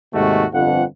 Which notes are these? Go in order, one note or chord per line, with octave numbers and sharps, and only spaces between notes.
D#2 G#2 C3 G#3 A3 F#4
G1 F2 F#5